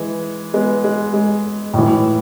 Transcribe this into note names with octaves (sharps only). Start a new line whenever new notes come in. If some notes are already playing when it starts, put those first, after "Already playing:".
Already playing: E3 G#3
G#3 B3
G#3
G#3
A2 E3